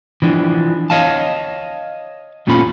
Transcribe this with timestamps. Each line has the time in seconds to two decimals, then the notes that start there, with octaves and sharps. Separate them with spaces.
0.22 E3 F3 D4
0.90 C#5 D#5 F5 A5
2.47 E2 A#2 C#4 F4 A4 B5